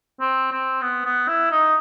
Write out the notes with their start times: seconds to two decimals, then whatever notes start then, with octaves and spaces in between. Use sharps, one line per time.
0.20 C4
0.52 C4
0.82 B3
1.05 B3
1.28 E4
1.51 D#4